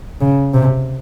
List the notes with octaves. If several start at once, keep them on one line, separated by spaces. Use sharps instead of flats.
C#3
C3